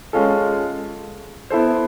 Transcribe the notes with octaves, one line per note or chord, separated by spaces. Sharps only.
G#3 C#4 F4 A4
B3 E4 A4 C5